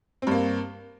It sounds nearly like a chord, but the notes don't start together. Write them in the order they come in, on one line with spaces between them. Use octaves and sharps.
C4 G2 A#3